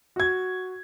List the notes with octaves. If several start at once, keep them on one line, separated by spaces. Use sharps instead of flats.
F#4 G#6